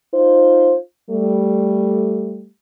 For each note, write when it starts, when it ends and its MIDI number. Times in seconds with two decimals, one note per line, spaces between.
0.14 0.77 63
0.14 0.77 65
0.14 0.77 72
1.11 2.48 55
1.11 2.48 57